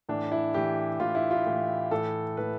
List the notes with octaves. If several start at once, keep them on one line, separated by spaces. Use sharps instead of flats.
A2 E3 D4
E4
A2 E3 G4
A2 E3 F4
E4
F4
A2 E3
A2 E3 A4
A2 E3 B4